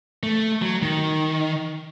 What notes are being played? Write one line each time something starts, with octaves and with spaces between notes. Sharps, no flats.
A3
F#3
D#3